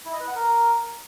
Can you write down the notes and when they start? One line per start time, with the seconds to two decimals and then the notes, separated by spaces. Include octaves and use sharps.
0.05 E4
0.13 D#5
0.20 B4
0.28 F#5
0.35 A#4